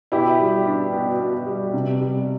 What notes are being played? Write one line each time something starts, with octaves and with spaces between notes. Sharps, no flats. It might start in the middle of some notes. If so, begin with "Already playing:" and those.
B2 E4 G4
G3
D4
B2
B2
G3
C3
G3